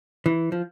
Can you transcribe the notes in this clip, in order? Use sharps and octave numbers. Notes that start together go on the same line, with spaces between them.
E3
F3